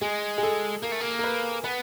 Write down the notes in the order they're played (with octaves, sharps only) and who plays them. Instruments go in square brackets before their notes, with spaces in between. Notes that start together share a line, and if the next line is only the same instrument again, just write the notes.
[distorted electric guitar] G#3 [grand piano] G#4
[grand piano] G#4
A4
[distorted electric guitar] A#3 [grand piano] A#4
[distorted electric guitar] A3
A#3
[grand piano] A#4
B4
[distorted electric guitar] B3 [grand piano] B4